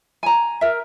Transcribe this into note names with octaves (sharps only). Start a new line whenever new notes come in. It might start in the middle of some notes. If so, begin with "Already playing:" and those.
G#5 A#5
A#4 E5